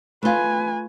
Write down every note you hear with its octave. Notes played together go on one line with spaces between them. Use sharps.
A3 F4 B4 G#5